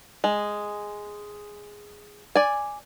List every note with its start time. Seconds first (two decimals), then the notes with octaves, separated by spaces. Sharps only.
0.24 G#3
2.36 D5 G#5